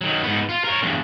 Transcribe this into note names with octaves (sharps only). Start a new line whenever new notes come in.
D#3 F#3
G#2 B3
F4
A#4 C#5
E2 G2